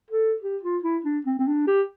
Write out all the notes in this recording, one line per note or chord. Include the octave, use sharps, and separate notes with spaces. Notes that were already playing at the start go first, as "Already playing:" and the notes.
A4
G4
F4
E4
D4
C4
C4
D4
G4